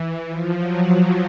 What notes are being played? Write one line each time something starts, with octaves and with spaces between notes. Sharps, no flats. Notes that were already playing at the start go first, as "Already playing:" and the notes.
Already playing: E3
F3
F#3